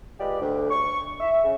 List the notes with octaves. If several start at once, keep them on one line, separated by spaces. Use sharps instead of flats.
G#3 F4 G4 B4 D5
D2
C#6
E5
C#3